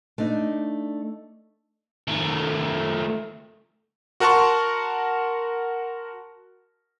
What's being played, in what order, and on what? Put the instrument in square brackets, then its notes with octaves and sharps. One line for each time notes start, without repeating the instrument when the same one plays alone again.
[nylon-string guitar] A3 D4 D#4
[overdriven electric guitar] D#3 A3
[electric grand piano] F#4 A#4 F#5 A5 C6 C#6